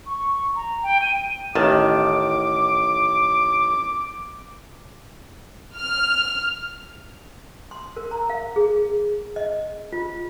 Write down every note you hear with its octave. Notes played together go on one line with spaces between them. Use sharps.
C#6
A#5
G5
D#7
A1 D#3 A5 D6
F6
C6
A#4
A#5
F5
G#4
D#5
F4